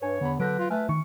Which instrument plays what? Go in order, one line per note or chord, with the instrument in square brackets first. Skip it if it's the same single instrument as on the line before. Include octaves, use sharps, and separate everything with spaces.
[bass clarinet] G2 [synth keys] B4 G#5 [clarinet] C#5
[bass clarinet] E2 [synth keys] D3 B5
[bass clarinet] D3 [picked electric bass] F#3 [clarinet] B4 [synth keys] G6 A#6 D7
[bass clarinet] F4
[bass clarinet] A3 [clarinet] B4 [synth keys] G#5 F6
[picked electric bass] D#3 [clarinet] C#6